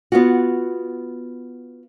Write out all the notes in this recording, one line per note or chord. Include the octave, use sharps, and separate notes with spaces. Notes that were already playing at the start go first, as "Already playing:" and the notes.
B3 F4 F#4